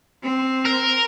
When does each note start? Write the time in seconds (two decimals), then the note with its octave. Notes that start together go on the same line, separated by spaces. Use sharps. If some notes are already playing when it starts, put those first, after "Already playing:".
0.23 C4
0.65 A#4